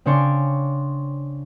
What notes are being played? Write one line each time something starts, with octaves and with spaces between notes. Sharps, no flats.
C#3 C4 D4 C#5 C6 D6